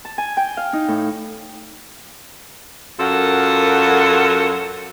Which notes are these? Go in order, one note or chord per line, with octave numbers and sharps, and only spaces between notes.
A5
G#5
G5
F5
D#4
A2
F#2 F4 A4 A#4 F#5